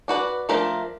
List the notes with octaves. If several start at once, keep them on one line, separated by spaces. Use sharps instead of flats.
D4 F#4 B4 D5
F3 A3 D4 F4 A#4